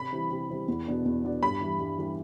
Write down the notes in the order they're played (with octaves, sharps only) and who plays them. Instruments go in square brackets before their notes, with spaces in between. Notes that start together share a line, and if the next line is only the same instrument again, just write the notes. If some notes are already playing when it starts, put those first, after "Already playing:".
Already playing: [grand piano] C3 [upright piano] B5
[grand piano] E3 G3 C4 E4
C3
E3 G3 C4 E4
E2
B2 B3 D4
E2
B2 B3 D4
[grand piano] G2 [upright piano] B5
[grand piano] E3 G3
G2
E3 G3